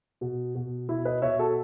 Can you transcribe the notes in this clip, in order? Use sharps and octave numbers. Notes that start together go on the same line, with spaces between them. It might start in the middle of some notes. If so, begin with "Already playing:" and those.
B2
B2
B2 E4
B4 D#5
B2 C#5 E5
F#4 A4